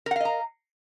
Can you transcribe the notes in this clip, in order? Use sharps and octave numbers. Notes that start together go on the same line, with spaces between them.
A#4 D#5 F5 F#5 A#5